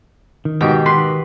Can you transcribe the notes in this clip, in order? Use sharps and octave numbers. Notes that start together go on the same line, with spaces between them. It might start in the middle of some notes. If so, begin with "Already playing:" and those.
D#3
G#2 B2 F#4 G4 G5
B4 C6